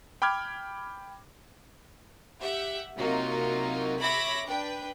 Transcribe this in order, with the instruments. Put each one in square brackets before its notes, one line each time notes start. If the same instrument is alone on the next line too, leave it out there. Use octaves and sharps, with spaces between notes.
[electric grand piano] G5 B5 D6 F6 G#6
[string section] G4 E5 F#5
C3 F#3 A#3 D#4 F4 F#4
C#5 E5 B5 D6 A#6
D4 B4 G5